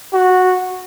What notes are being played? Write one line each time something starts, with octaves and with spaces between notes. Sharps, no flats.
F#4